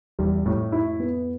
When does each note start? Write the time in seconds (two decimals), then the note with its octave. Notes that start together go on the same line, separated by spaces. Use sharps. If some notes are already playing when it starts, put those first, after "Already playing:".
0.19 E2 G3
0.46 F2 A2
0.72 E4
1.00 B3